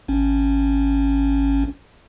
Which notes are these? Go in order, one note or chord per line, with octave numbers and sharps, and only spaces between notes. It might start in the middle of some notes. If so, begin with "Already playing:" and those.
G#1 C#4